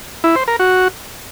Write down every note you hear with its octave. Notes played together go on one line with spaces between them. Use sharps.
E4
C5
A#4
F#4